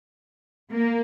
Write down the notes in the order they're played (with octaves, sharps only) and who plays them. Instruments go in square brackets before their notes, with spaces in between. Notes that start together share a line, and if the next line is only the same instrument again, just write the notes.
[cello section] A#3